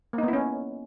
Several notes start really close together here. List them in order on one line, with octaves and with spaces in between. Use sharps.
A#3 D#4 B3 E4 C#4